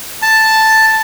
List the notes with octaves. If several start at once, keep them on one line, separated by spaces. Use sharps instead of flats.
A5